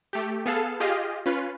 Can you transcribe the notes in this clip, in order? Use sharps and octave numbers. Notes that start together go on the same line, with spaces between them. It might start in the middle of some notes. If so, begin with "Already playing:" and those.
A3 G4
B3 G#4 A4 F5 A5
F4 G4 G#4 D#5 F5
C#4 F4 B4